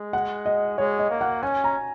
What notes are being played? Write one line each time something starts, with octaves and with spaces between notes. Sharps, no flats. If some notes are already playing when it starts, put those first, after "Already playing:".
Already playing: G#3
F#5
D#5
G#3 C#5
D#5
A#3
F#5
C#4 G#5
A#5